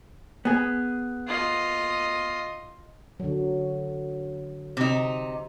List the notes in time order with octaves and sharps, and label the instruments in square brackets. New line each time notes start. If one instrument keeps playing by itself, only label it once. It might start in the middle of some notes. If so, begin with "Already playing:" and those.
[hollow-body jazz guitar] B3 G#4
[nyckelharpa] F4 D#5
[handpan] D3 F#3
[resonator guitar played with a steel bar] C3 D#4